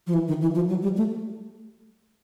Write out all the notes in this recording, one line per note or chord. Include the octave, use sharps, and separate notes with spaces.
F3
E3
D#3
E3
F3
F#3
G3
A3